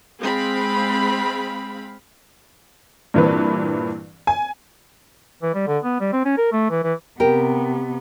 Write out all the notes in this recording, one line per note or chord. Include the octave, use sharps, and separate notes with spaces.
G#3 C4 F5 B5
G2 A#2 E3 C4 B4
G#5
E3
G3
D3
B3
G3
C4
C#4
A#4
A3
E3
E3
C3 B3 G4 A#4